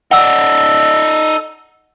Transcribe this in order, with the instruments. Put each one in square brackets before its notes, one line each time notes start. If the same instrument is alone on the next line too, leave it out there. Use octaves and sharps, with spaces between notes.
[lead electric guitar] D#4 D5 [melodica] A4 [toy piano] F#5 E6